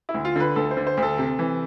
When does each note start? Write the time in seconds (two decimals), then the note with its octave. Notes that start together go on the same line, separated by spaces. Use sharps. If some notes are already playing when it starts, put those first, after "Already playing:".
0.09 E4
0.14 D2
0.25 F4
0.36 D3 B4
0.56 D2 A4
0.71 C5
0.77 D3
0.87 C5
0.97 D2
1.02 A4
1.18 C3
1.39 E3